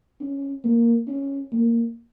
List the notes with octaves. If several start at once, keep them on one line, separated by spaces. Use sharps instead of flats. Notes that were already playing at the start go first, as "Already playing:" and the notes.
C#4
A#3
C#4
A#3